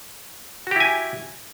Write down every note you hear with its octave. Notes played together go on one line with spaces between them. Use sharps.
E4 F#4 G4 G#5